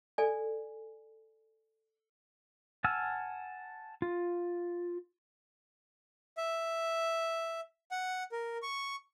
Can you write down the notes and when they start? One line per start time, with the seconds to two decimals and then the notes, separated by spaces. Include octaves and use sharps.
0.18 A4 D5 G#5
2.84 F#5 G#5 A5 E6 F6
4.02 F4
6.37 E5
7.91 F#5
8.32 A#4
8.62 C#6